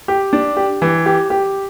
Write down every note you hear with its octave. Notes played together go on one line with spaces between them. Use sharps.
G4
D4
G4
E3
G4
G4